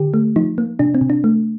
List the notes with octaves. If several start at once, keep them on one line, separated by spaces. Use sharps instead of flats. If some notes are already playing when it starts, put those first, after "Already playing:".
Already playing: D3 G4
A3
F3 D#4
A#3
C3 D4
C4
C3
D4
A3